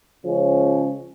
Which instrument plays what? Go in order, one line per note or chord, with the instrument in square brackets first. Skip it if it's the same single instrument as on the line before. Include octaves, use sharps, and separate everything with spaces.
[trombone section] C#3 F3 G#3 C#4